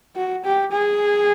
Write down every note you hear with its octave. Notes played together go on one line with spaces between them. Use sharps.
F#4
G4
G#4